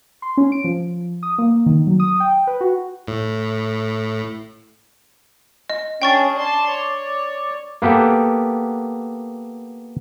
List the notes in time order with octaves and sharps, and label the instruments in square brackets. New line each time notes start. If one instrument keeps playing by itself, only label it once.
[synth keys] C6
C#4
D7
F3
D#6
A#3
D#3
F#3
D#6
G5
B4
F#4
[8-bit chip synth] A2
[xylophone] D#5
[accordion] C#4 [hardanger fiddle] D4 G#4 [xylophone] G5 C#6 A6
[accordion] D5 [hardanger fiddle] A5 C6
[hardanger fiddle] C#5
[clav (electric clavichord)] A#3 B3 G4 A4